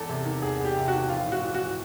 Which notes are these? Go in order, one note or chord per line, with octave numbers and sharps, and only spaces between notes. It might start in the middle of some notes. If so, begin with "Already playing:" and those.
Already playing: E1 E2 A4
C3
D#3
E1 G#4
E2
G4
C3
F#4
D#3
A#1 F4
A2
F#4
E3
F#4